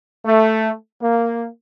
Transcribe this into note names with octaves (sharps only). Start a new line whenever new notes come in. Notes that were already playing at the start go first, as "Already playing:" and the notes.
A3
A#3